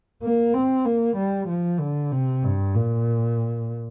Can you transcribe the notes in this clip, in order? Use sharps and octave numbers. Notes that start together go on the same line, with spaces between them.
A#3
C4
A#3
G3
F3
D3
C3
G2
A#2